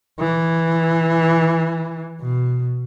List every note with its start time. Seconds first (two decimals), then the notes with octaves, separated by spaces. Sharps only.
0.19 E3
2.21 B2